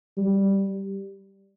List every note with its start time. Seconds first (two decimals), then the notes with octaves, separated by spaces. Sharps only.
0.18 G3